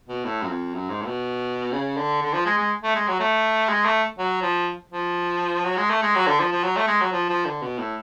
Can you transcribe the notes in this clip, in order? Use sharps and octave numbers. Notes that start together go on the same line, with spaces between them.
B2
A2
F#2
F2
F#2
G#2
A2
B2
C#3
D3
D3
F3
G#3
G#3
A3
G#3
F#3
A3
G#3
A3
F#3
F3
F3
F#3
G#3
A3
G#3
F#3
D3
F3
F3
F#3
A3
G#3
F#3
F3
F3
D3
B2
A2